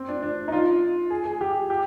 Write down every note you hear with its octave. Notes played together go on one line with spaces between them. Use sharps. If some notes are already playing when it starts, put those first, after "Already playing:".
Already playing: C4
D4
D4
D#4
F4
G#4
G#4
G4
G4